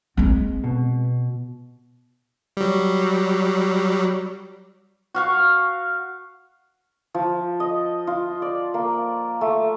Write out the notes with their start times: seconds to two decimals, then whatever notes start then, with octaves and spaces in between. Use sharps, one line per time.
0.17 G#3 C4
0.64 B2
2.57 F#3 G3
5.14 F#4 F5 C#6
7.14 F3
7.60 D#5
8.07 F4
8.42 D5
8.74 A#3
9.41 A3